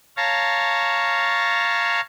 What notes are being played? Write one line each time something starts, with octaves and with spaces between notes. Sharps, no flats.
C#5 F5 A5 A#5